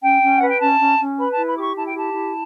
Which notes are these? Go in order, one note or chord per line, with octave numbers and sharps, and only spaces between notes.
C#4 G5
C#4
B4 F#5
G5
C#4 A5
C#4
C#4
B4 B5
A5
E4
B5
G4 C#6 D6
E4 A5
G5
G4 A5
E4